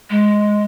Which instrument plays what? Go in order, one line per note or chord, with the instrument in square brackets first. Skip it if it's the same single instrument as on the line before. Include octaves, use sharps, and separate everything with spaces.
[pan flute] G#3